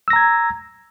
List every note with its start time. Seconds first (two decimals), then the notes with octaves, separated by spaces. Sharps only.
0.08 E6
0.10 A#6
0.13 A#5
0.16 G#6